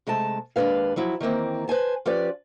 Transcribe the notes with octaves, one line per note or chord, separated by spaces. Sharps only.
C3 G#3 A3 A5
D#2 G#3 A#3 D4 B4 F5
F3 F#3 E4
D#3 E3 A#3 C4
B4 C5 G#5 A5
F3 C#4 G4 B4 D5